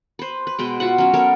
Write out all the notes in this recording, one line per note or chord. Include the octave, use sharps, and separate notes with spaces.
B4 C5
B4
B2 G#3 B4 G5
F4 F#4 E5 F#5
F#3 C#4
B3 A4 A#4 C#5